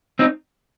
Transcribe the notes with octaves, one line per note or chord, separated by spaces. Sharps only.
C4 D#4